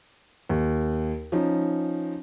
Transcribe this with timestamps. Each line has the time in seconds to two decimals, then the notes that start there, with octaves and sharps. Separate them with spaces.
0.49 D#2
1.32 F3 C#4 D#4